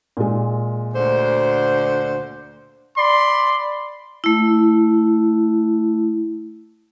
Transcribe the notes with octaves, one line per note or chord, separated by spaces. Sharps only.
A#2 G#3
D2 D3 C5
D5 B5 C6
A3 E4